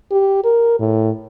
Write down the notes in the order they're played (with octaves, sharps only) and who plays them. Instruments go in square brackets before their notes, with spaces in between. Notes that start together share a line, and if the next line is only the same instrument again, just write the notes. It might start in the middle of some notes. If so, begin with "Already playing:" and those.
[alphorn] G4
A#4
A2